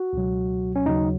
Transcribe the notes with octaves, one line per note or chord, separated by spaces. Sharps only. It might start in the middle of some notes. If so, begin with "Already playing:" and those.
Already playing: F#4
C#2 B2 F#3
C#4
D#2 C#3 F#3 D#4